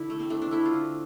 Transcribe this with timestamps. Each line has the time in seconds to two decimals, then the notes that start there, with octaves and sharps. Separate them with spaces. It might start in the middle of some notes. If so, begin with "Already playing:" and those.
Already playing: D3 E4
0.10 A3
0.19 C4
0.30 A3 D4
0.42 D4
0.51 A3 E4
0.65 F4
0.73 D3